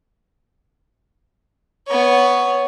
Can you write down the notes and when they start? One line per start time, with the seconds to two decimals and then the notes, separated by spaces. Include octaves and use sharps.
1.87 B3 C#5